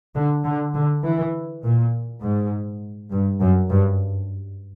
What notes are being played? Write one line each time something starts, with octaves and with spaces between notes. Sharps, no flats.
D3
D3
D3
E3
A#2
G#2
G2
F#2
G2